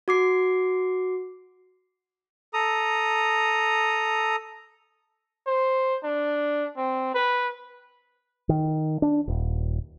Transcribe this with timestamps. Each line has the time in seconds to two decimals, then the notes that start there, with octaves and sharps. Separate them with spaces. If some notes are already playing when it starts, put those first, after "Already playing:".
0.08 F#4 D6 C7
2.54 A4 A#5 D#6
5.47 C5
6.03 D4
6.77 C4
7.15 B4
8.49 D#3
9.02 D4
9.28 D#1